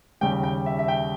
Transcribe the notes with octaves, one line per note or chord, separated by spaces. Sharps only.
D#2 C#3 G3 G5
G5
E5
E5
G5